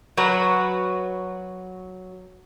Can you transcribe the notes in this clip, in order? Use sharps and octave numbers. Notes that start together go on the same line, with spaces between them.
F#3 F#4 B4